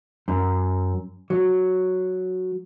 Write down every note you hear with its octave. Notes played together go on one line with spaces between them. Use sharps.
F#2
F#3